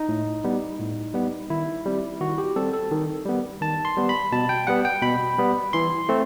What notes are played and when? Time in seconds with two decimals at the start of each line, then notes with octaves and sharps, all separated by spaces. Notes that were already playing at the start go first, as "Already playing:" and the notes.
Already playing: D#4
0.09 A2
0.44 G3 B3
0.79 A2
1.14 G3 B3
1.50 D#3 E4
1.86 G3 C4
2.21 D#3 F#4
2.38 G4
2.56 G3 C4 A4
2.73 A4
2.91 D#3
3.26 G3 B3
3.61 D#3 A5
3.85 C6
3.97 G3 B3
4.09 B5
4.32 B2 A5
4.49 G5
4.67 G3 B3 F#5
4.85 G5
5.02 B2 B5
5.38 G3 B3
5.73 E3 C6
6.09 A3 C4